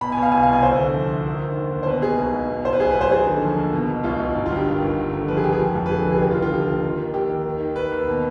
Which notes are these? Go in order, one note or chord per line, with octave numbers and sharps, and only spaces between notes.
B2 B5
G#5
B2
F5
C2 G#5
F5
C2
G#5
D2 C5
D3
F3
D2
D#3
D#3
D#2
D#2
C5
B2 B4
B2 G#4
B1
B1
B2
B2 C5
B4
B1 G#4
B4
B1
C5
D#2 G#4
D3
F3
D#2
B2
B2
B1 F4
B1
G1
F4
G2 G4
D#3
G1
D#2
D3
F3 B4
G#4
D#2 G4
G#4
F3
F2
B4
D3 G#4
F1 G#4
G#4
D#2 G4
F4
D3
F4
F3 G4
D#2
D#3
D#3
D#2 G4
D#2
D#3
D#3
D#2 B4
D#2
B2